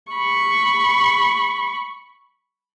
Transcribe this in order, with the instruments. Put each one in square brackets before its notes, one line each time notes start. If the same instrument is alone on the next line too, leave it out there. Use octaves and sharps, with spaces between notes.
[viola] B5 C#6